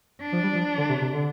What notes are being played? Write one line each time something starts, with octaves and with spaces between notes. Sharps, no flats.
D4
F3
G3
F3
D3
C3
C3
D3